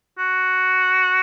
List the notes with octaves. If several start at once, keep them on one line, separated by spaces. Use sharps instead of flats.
F#4